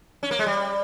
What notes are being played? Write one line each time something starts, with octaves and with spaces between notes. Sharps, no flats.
C#4
A#3
G#3
G3